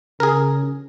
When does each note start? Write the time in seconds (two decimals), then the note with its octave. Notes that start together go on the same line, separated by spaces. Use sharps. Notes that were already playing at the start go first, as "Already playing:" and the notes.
0.20 C#3 G#4 A#4